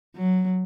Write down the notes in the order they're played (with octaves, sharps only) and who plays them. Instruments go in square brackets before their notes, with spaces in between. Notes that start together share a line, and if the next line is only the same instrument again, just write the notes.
[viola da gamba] F#3